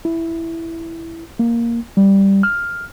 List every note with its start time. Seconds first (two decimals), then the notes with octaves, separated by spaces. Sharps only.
0.05 E4
1.39 A#3
1.97 G3
2.43 F6